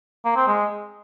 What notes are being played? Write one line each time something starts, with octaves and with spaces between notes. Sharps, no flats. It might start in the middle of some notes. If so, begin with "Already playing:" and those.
A#3
C4
G#3